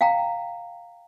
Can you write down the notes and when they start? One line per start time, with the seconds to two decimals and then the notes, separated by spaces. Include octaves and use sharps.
0.01 F5 G5 A#5